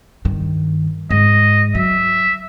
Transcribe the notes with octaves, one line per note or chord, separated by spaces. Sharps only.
G2 D#3
G#2 D#5
F#3 E5